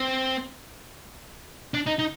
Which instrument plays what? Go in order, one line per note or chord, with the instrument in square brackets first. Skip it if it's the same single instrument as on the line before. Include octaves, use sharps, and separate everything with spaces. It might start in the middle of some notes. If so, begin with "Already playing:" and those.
Already playing: [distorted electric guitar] C4
D4
D#4
D#4